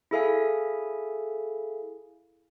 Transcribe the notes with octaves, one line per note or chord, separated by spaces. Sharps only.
E4 G#4 A4 E5 F5 G#5